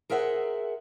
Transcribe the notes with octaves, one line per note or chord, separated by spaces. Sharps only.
G#4 A#4 C5 E5 F#5